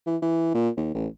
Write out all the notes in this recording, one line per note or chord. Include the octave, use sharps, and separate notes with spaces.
E3
E3
A#2
D#2
A1